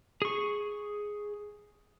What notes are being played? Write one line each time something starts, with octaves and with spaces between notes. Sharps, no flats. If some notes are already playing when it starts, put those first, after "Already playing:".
G#4 C#6